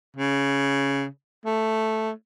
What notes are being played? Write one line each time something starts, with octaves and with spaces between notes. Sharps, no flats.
C#3
A3